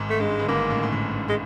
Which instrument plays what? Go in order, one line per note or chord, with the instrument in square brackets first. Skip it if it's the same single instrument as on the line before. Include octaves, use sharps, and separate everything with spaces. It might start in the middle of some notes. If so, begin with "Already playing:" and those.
Already playing: [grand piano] G#1 G#2
[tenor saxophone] A3
[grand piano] G2 [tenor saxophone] G#3
[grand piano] G#2
G1 G2
[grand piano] G#1 G#2 [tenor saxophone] A#3
[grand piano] A1 A2
A2
G#1 G#2
A1 A2
[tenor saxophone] G#3